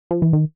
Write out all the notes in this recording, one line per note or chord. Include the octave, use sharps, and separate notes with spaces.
F3
E3
D#3